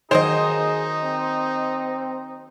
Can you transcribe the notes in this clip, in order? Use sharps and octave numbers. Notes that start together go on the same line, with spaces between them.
D#3 F#3 A#3 D#4 G#4 C5 D#5
C4